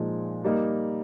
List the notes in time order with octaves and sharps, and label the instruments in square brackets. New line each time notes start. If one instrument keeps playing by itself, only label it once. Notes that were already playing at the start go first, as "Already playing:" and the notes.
Already playing: [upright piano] A#2 F3 G#3 D#4
G3 A#3 D#4